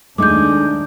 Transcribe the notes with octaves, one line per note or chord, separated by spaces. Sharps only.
D#2 G#3 A3 D4 D#4 D6 G6